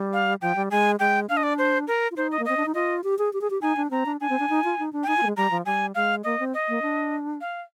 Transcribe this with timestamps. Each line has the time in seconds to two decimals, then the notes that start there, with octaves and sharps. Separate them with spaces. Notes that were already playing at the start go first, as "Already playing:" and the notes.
Already playing: G3
0.13 F5
0.42 F3 G5
0.56 G3
0.71 G#3 G#5
0.99 G#3 G5
1.29 D4 F5
1.37 D#5
1.43 D5
1.58 C5
1.87 A#4
2.11 F4
2.16 D#4 C5
2.32 D#5
2.39 A#3
2.45 C4 D#5
2.57 D4
2.66 D#4
2.74 F4 D#5
3.04 G4
3.19 G#4
3.33 G4
3.41 G#4
3.50 G4
3.62 D#4 G#5
3.77 D4
3.91 C4 A#5
4.06 D4
4.21 D4 G#5
4.30 C4
4.39 D4
4.49 D#4
4.64 F4
4.79 D#4
4.93 D4
5.03 G5
5.08 D#4 G#5
5.17 F4
5.23 A#3
5.27 G#3
5.37 G3 A#5
5.51 F3
5.66 G3 G#5
5.95 G#3 F5
6.24 A#3 D#5
6.40 C4
6.54 D#5
6.69 A#3
6.82 D4
7.41 F5